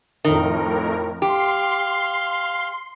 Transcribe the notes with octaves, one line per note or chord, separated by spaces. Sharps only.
F2 A2 D#3 A#4
G4 F5 C6